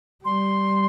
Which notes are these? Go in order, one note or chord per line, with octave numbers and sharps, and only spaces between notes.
G3 C6